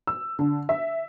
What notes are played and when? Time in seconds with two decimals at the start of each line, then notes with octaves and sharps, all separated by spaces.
0.07 E6
0.39 D3
0.69 E5